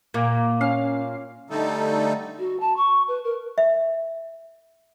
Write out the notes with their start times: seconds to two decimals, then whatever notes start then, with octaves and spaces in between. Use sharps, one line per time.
0.14 A#2 A#3
0.61 C#4 F5
1.50 D3 G3 A3 D#4 A4
2.39 F#4
2.60 A5
2.77 C#6
3.08 B4
3.24 A#4
3.58 E5